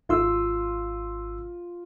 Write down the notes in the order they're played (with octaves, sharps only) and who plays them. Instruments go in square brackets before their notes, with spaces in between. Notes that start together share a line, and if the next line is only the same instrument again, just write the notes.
[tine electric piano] G#1 C6 E6 [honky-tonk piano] F4